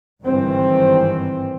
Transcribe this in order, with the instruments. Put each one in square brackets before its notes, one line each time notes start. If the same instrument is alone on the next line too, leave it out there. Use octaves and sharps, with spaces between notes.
[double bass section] G1 G#2 D#3 E3 G3 C4